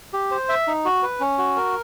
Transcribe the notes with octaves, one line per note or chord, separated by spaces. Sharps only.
G4
C5
E5
D#4
F#4
B4
C#4
F#4
A#4